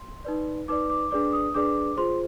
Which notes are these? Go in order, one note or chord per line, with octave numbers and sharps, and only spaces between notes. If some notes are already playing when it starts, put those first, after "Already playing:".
Already playing: C6
D#4 B4 D5
D#4 B4 D5 D6
D6
D4 G#4 B4 D5 D6
D#6
D4 G#4 B4 D5 D6
F4 G#4 C5 C6